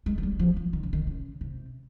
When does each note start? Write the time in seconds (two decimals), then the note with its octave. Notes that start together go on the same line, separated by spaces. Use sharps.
0.06 G#3
0.18 F3
0.23 G3
0.39 F3
0.56 F3
0.73 D#3
0.83 C#3
0.93 D#3
1.07 C#3
1.41 C3